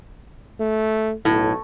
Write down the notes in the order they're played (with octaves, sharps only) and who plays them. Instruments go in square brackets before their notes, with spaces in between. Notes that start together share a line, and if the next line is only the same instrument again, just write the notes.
[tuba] A3
[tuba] B1 [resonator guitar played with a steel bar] A2